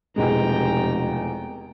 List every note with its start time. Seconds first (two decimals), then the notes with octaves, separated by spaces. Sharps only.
0.16 F1 E2 B2 G#3 G5 A#5